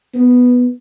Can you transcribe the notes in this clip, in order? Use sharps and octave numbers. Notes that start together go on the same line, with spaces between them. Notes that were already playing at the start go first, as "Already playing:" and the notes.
B3